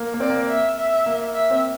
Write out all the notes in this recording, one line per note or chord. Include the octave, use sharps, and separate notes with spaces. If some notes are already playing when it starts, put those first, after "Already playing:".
Already playing: A#3
A#3
C4 D5
A#3
E5
E5
A#3
E5
C4